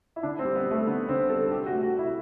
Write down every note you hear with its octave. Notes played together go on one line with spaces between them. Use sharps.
E4
D3 D4
C4
G3
B3
G3
A3
D3 B3
D3 C4
G3 A4
C3 G4
F#4
A3
F#4
C3
E4